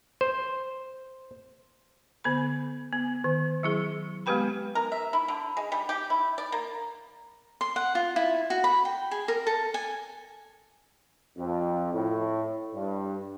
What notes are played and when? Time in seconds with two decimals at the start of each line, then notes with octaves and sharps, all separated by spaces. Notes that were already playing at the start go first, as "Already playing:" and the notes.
0.21 C5
2.24 D3 B3 A4 B5
2.93 B3
3.24 D#3
3.63 F#3 E4 G#4
4.26 G#3 B3 G4 B4 G5 B5
4.75 A#4
4.92 E5
5.13 E4
5.28 D3
5.57 G#3
5.72 G3
5.89 G4
6.10 E4
6.38 D5
6.52 A#3
7.61 C6
7.76 F#5
7.95 F4
8.16 E4
8.50 F#4
8.64 B5
8.85 G5
9.11 G#4
9.28 A#4
9.47 A4
9.74 G#5
11.37 F2
11.94 A2
12.74 G2